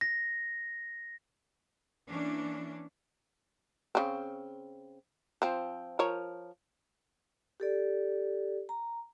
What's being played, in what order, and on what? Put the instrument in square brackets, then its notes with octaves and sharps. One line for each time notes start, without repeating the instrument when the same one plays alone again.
[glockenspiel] A#6
[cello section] E3 A#3 C#4 D4
[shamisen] C#3 C4
F3 C4
F3 A#4 C#5
[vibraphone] G4 A4 D5
A#5